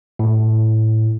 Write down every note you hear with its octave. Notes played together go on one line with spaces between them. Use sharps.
A2